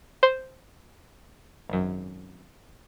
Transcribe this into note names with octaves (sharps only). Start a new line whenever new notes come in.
C5
G#1 F#2